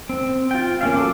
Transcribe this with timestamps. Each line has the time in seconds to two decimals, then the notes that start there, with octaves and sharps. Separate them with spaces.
0.09 C4
0.51 F4 G5
0.81 A#3 C#4 F5
0.96 F#3 A4 A5 D6